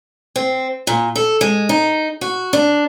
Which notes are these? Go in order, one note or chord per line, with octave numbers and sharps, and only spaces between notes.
C4
A#2
A4
G#3
D#4
F#4
D4